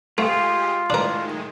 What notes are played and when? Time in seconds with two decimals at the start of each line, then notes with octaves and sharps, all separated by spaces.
0.18 G#3 A3 F4 G4 G#4
0.90 A2 D#3 G#3 D4 A#4